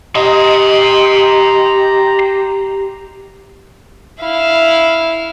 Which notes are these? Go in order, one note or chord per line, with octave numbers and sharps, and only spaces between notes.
G4 D#5 A#5 C6
E4 F5